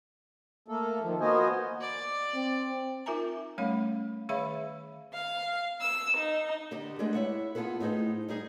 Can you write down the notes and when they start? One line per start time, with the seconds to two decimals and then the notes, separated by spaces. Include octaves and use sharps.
0.68 A3 A#3 A4
1.02 D#3 F3
1.20 A#3 B3 F#4 C5 D#5 G#5
1.81 D5
2.35 C4
3.06 D#4 F4 A#4 E5 G#5 A#5
3.58 G3 A3 C#4 C#5 F5 B5
4.29 D#3 G#4 C#5 E5 F5 B5
5.12 F5
5.81 E6
6.17 D#4
6.71 D3 G4 D#5
6.99 G#3 A3 B3 D4 G4 G#4
7.14 E4 C#5 E5 F#5
7.55 B3 F4 F#4 G#4 A4 B4
7.80 A2 D#4 G#4 C5
8.28 G3 D#4 G#4